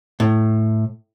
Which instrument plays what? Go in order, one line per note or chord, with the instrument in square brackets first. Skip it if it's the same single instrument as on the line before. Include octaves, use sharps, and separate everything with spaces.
[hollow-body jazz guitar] A2